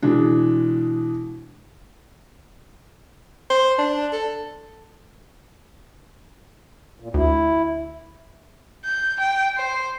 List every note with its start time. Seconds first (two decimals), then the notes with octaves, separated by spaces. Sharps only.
0.02 B2 E3 G#3 D4
3.50 C5
3.79 D4
4.12 A4
7.00 A#2
7.14 D2 E4
8.85 G6
9.20 G5
9.57 C5